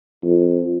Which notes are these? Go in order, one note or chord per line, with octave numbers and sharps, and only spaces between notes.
F2